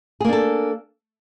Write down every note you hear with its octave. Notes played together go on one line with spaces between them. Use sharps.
A#3 D4 G#4 A4